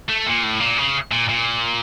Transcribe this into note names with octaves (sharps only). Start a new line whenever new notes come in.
A3
A#2
A2
A#2
C#3
A#2
A#2